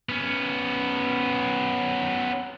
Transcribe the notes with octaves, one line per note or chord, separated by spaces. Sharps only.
B3 C#4